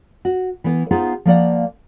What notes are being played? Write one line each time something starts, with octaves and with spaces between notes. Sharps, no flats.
F#4
E3 B3
B3 D#4 F4 G#4 C5
F3 A#3 D5 F#5